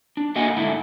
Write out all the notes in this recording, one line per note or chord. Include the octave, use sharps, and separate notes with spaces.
D4
A3 A#3 F#4 D#5 F#5 G#5
G#2 D3 A3 E4